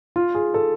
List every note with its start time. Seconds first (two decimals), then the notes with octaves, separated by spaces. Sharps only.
0.16 F4
0.35 G#4
0.54 A4